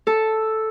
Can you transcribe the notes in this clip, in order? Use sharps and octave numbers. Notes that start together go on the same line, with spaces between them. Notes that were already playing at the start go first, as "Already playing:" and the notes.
A4